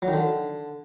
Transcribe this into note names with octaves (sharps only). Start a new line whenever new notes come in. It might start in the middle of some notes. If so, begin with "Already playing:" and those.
F#3
D#3
D3